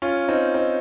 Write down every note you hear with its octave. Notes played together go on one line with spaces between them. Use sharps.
C#4 F4
C4 D#4
C4 D#4